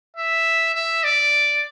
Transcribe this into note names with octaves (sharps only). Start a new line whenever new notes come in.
E5
E5
D5